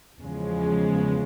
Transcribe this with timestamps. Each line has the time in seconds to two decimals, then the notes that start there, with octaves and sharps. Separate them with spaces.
0.20 E2 C#3 F3 G#3